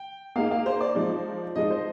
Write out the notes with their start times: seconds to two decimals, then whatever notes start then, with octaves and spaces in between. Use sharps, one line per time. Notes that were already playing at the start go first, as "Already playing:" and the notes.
Already playing: G5
0.36 A#3 D#4 G#4 F5
0.51 F5
0.66 C5
0.81 D5
0.95 F3 G#3 D#4
1.56 F3 G#3 D#4 D#5
1.70 C5